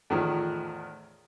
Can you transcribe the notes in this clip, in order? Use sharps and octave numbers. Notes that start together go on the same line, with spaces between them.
E2 A2 D#3 F3